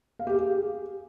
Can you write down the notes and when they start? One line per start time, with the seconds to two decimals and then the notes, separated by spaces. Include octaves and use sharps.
0.19 F5
0.27 G4
0.34 G#4